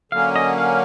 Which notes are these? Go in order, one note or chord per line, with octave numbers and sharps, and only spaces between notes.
D3 F#3 A#3 C#4 F5
D#5
F5